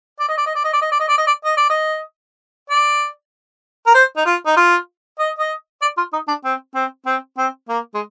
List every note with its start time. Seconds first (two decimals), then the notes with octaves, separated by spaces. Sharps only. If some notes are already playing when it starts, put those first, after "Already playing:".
0.20 D5
0.29 D#5
0.38 D5
0.46 D#5
0.55 D5
0.64 D#5
0.73 D5
0.82 D#5
0.91 D5
1.00 D#5
1.08 D5
1.18 D#5
1.27 D5
1.45 D#5
1.57 D5
1.70 D#5
2.70 D5
3.87 A#4
3.94 C5
4.17 D#4
4.26 F4
4.46 D#4
4.57 F4
5.19 D#5
5.39 D#5
5.82 D5
5.97 F4
6.13 D#4
6.28 D4
6.44 C4
6.75 C4
7.06 C4
7.37 C4
7.69 A#3
7.94 G#3